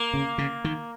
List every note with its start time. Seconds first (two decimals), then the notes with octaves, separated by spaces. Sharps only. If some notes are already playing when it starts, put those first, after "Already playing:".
Already playing: A#3
0.14 C#3
0.38 C#3
0.64 D#3